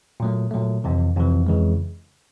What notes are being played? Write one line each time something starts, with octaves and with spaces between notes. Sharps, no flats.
A#2 F#3 A3
A#2 F#3 A3
F2 C3 E3
F2 C3 E3
F2 C#3 E3 G#3